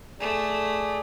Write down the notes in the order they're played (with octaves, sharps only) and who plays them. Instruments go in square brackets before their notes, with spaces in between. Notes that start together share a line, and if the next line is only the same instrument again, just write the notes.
[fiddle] A3 [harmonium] G#4 D5